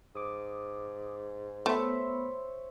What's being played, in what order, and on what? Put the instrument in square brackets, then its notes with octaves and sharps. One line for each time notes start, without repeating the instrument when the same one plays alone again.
[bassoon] G#2 [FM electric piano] D6 D#6
[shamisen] A3 [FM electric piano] B3 B5 [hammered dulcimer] C5 C#5 E5